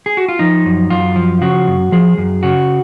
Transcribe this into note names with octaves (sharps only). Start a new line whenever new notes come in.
G#4
F#4
F4
F3 D#4
F#2
F#2 F4
F3
C#3 F#4
F#2
F3 G#4
F#2
C#3 F#4